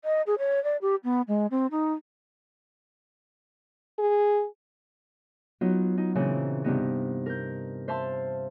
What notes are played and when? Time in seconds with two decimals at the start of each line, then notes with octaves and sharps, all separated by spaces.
0.04 D#5
0.27 G#4
0.38 C#5
0.64 D5
0.81 G4
1.04 B3
1.28 G#3
1.51 C4
1.71 D#4
3.99 G#4
5.61 F#3 B3 D#4 F4
5.98 D#4
6.15 A#2 C#3 E3 C4 D#4
6.64 G2 C3 B3 D#4
7.26 A#4 G6
7.88 C5 E5 F5 A5 C6